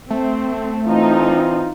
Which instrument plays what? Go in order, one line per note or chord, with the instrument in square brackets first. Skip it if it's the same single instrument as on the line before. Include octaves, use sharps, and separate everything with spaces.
[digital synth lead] A3 [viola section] C4
[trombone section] E3 C4 F4 [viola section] D#4